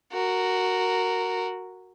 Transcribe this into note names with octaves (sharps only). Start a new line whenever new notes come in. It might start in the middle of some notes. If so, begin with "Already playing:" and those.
F#4 A#4